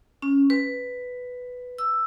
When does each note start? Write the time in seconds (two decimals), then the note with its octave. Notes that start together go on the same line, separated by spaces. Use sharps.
0.22 C#4
0.50 B4
1.78 E6